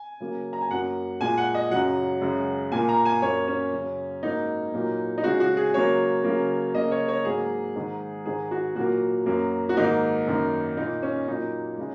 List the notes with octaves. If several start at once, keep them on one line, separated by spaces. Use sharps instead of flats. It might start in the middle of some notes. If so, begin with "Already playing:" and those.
Already playing: G#5
C#3 F#3 A#3
A#5
G#5
F#2 F#3 A#3 F#5
A#2 G#3 G#5
F#5
D#5
F#2 C#3 F#3 F#5
F#2 C#3 G#3
A#2 A#3 G#5
A#5
G#5
F#2 F#3 A#3 C#5
C#4
F#2 C#3 F#3
G#2 F#3 A#3 D#4
A#2 F#3 A#3
D#4
C#3 G#3 F#4
F#4
G#4
C#3 F#3 A#3 C#5
C#3 F#3 A#3
C#3 A#3 D#5
C#5
C#5
G#2 F#3 A#3 G#4
G#2 D#3 G#3
G#2 D#3 G#3 G#4
F#4
A#2 F#3 A#3 F#4
F#2 F#3 A#3
F#4
G#2 D#3 A#3 D#4
F#2 D#3 A#3
A#2 A#3 D#4
C#4
A#2 F#3 A#3 D#4
C#3 G#3